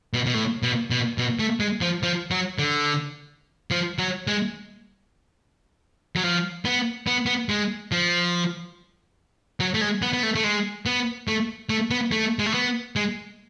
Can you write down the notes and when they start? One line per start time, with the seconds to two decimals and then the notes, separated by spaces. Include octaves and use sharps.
0.14 B2
0.26 B2
0.34 A2
0.63 B2
0.90 B2
1.18 B2
1.39 A3
1.60 G#3
1.81 F3
2.03 F3
2.31 F#3
2.59 D3
3.71 F3
3.98 F#3
4.27 G#3
6.16 F#3
6.24 F3
6.65 B3
7.07 B3
7.26 B3
7.49 G#3
7.92 F3
9.60 F#3
9.74 A3
9.81 G#3
10.02 B3
10.13 B3
10.23 A3
10.35 A3
10.44 G#3
10.86 B3
11.28 A3
11.69 A3
11.91 B3
12.12 A3
12.39 G#3
12.46 A3
12.54 B3
12.96 G#3